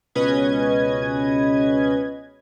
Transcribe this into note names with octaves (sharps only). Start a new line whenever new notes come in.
C#2 B2 C#4 B4 D#5 G#6